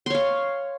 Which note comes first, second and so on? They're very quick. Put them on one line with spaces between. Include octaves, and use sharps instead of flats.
C6 C#5 F5